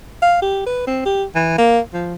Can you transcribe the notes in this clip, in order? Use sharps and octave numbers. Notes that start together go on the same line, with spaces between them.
F5
G4
B4
C4
G4
E3
A#3
F3